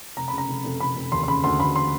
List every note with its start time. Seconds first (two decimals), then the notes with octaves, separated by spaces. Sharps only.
0.17 F1 A#5
0.28 B5
0.33 C#3 A#5
0.49 F1
0.64 F1
0.80 F1 B5
0.96 F1
1.12 D#2 C6
1.23 C6
1.28 C#3 B5
1.44 D2 C6
1.60 D2 B5
1.76 C6